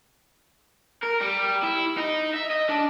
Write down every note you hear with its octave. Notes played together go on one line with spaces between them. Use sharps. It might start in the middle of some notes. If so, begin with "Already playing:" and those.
A#4
G3
E4
D#4
E5
D#5
D4